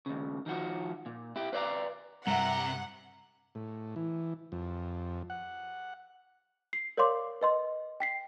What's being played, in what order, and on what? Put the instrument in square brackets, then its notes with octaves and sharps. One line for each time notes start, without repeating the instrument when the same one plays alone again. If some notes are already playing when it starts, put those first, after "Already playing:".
[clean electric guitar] D#2 C#3
D#3 F3 F#4
A#2
E4 G4
B4 C5 D5 E5 F5 A#5
[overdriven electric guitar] C2 C3 [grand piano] G2 E5 [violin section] F#5 [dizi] A#5
[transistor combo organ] A2
E3
F2
F#5
[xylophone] C7
A#4 C#5 D5 F5 C6 D6
B4 D#5 C6
G5 B6 C7